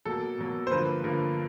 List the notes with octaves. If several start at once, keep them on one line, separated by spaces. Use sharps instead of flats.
B2 F#3 A#3 A4
B2 F#3 A#3
C5
G2 D3 F3 A#3 B4
G2 D3 F3 A#3